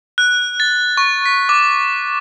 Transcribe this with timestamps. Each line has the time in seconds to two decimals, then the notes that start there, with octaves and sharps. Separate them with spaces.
0.18 F#6
0.60 A6
0.97 C#6
1.26 B6
1.49 D6